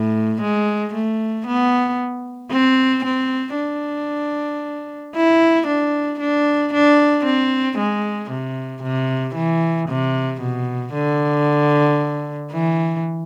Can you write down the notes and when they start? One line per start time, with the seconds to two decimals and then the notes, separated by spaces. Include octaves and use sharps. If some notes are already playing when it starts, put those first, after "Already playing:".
Already playing: A2
0.42 G#3
0.94 A3
1.47 B3
2.51 C4
3.04 C4
3.57 D4
5.15 E4
5.67 D4
6.20 D4
6.73 D4
7.25 C4
7.78 G#3
8.31 C3
8.83 C3
9.35 E3
9.89 C3
10.41 B2
10.93 D3
12.52 E3